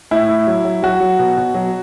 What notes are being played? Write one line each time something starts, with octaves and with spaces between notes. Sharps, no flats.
A2 E4
A2
F#3
F#3
F#3 F#4
F#3
B2
B2
F#3